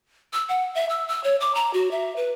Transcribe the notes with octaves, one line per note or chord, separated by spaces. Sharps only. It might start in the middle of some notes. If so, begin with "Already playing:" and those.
E6
F#5
E5
E6
E6
C#5
D6
A#5
F#4
E5
B4